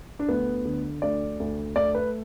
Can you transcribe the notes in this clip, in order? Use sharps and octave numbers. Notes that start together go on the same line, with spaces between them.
D4
D2 B3
D3
D2 D5
D2
A3 D5
B4